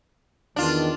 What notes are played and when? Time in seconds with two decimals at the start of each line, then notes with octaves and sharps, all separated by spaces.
0.56 E2 D#3 D4 F4